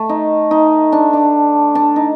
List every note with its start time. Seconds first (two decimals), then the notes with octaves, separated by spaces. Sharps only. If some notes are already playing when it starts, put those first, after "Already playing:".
Already playing: A3
0.09 D#4
0.51 D#4
0.92 D4
1.13 D4
1.75 D4
1.96 D#4